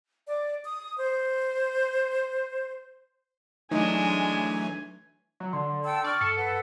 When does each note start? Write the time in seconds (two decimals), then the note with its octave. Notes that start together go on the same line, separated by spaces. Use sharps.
0.27 D5
0.65 D#6
0.98 C5
3.71 E3 F#3 G#3 A3 D4 D#4 G#5
5.40 F#3
5.53 D3 C6
5.84 G5 A5 E6
6.04 D5 C#6 F6
6.21 G2 A4 C#7
6.37 B4 F#5